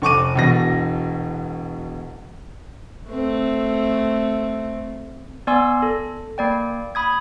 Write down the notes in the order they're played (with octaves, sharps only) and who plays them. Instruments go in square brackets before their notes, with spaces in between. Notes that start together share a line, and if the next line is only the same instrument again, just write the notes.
[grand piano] F1 C#6 D6 D#7
E1 B2 A#6
[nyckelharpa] A3 C4
[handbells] B3 D5 G#5 C6 E6
A4
A#3 D5 G5
B5 D#6 G#6